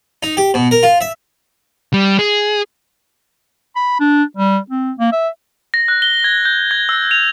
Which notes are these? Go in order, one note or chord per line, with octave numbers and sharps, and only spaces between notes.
D#4
G4
B2
A#4
F4
E5
G3
G#4
B5
D4
G3
C4
A#3
E5
A#6
F#6
G7
G#6
G6
G#6
E6
F7